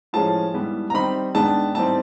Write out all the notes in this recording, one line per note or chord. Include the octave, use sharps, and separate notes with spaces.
A2 F3 G#3 C#4 A5
G#2 E3 G3 B3
A#5
D#3 G3 C4 D#4 B5
G#2 D#3 G#3 B3 D4 A5
A2 E3 G3 C4 D#4 A5